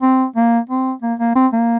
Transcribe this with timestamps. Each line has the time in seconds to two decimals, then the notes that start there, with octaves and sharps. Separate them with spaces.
0.02 C4
0.36 A#3
0.69 C4
1.02 A#3
1.20 A#3
1.35 C4
1.53 A#3